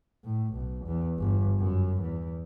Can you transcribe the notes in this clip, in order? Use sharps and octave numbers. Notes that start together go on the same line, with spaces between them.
A2
B1
E2
G1
F#2
E2